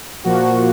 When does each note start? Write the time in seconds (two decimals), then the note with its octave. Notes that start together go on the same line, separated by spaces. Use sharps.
0.24 A#2 F3 A#3 F#4